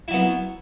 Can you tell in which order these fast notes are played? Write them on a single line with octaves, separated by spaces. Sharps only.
E4 F#3 B3